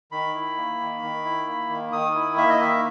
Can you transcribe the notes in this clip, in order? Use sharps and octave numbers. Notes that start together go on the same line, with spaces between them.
D#3 B5
E4
A#3
D#3
D#3
E4
A#3
D#3
D#3 D#6
E4
A#3 E5
D#5
D#3 E5